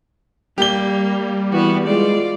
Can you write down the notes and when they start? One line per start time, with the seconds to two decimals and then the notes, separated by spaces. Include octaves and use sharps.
0.58 G3 A#3 G4 G7
1.52 E3 B3 F#4
1.87 G#3 F4 D5